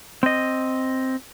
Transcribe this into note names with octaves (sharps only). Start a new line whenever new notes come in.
C4 D#5